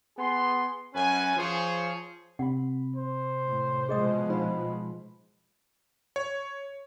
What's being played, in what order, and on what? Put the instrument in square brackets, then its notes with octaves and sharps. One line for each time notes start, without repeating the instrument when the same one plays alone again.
[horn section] B3 G#4 C6
F#2 C#4 B4 G#5
F3 F4 G#4 C5 C#5
[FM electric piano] C3 B5 [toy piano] F#5
[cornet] C5
[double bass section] A2
[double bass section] B2 F3 G#3 [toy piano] G#4 D#5 D#6
[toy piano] D#4 [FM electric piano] F4 C5 F5 [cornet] B5
[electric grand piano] C#5